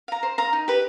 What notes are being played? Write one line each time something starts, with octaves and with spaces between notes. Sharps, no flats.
F5 A#5
C5
F5 A#5
D#4
G4 B4